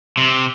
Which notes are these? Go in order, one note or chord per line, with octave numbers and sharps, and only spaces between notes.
C3